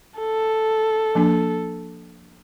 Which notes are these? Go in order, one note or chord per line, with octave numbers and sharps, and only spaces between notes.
A4
F3 A#3 D4